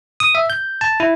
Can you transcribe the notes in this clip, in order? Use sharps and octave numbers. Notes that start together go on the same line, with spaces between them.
D#6
E5
G6
A5
E4